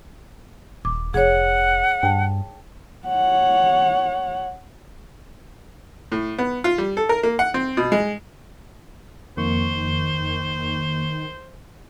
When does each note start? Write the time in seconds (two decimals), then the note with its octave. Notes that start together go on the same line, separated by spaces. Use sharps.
0.85 D#1 D6
1.14 F1 G#4 C#5 F#5
2.03 G2 G5 A5
3.07 C#5 F#5
6.12 A2
6.39 B3
6.64 F4
6.78 G3
6.97 A4
7.09 A#4
7.23 A#3
7.39 F#5
7.54 C4
7.77 B2
7.92 G#3
9.37 F2 D#3 A#3 C5 C#6